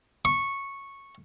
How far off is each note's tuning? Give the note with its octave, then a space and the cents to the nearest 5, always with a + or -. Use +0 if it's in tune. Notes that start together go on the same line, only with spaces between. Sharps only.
C#6 -10